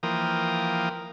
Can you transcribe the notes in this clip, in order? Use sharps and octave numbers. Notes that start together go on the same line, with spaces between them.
E3 F3 A#3 A#4 G5 D#6